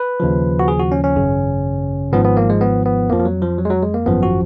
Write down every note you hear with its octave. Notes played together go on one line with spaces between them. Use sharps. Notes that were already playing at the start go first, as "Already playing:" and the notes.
Already playing: B4
D#2 C#3 F3
F#4
G#4
F#4
C#4
C#4
G#1 F#2 C#3
G#1 G#2 F3 B3
B3
A#3
G#3
B3
B3
F2 F3 A#3
F3
F#3
F3
F#3
G#3
F#3
G#3
A#3
G#1 F#2 F3 B3
F#4